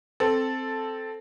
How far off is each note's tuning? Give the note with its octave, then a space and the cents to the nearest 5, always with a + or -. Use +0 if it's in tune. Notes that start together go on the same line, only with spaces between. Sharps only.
C4 +0 A4 +0